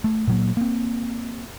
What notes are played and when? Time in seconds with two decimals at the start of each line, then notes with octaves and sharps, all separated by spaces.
0.04 A3
0.27 A#2 F#3 A#3
0.57 A#3 C4